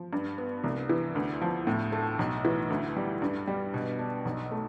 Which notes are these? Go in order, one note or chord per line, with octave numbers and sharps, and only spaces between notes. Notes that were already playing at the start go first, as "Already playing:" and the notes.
Already playing: F3
G2
B3
C2
E3
D2
F3
A2
A3
B1
E3
D2
G3
G2
G3
B2
D4
B1
A3